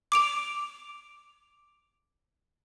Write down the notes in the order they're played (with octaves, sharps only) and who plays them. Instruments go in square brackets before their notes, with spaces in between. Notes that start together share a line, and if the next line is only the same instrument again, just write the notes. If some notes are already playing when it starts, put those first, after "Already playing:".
[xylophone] D6 D7 F7